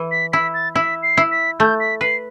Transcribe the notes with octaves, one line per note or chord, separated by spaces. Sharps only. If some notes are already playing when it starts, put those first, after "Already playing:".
Already playing: E3
B6
E4 B6
A6
E4 B6
C7
E4
B6
A3 G6
B6
B4 C7